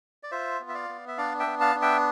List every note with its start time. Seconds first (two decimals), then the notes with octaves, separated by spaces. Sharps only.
0.23 D5
0.31 F4 C5 E5
0.60 B3
0.69 E5
0.74 D5 F5
0.89 B3
1.08 E5
1.18 D4 D5 F5
1.40 E5 G5
1.47 B3
1.60 F5 A5
1.75 D4
1.82 E5 G5